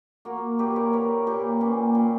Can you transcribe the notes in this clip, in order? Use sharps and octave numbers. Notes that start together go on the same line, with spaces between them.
A#3 F#4 A#4
A#2 G4 B4
A#4 C#5
A#3 A#4 C#5
A#2 G4 B4
A#2 C#4
A#2